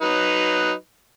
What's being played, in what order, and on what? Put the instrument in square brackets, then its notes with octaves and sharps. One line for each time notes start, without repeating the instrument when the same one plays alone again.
[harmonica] F#3 D#4 B4